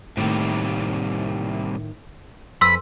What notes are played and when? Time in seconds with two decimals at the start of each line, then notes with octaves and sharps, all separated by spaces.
0.17 A2 C3 D#3 G3 A#3
2.61 F2 B4 G#5 B5 C6 E6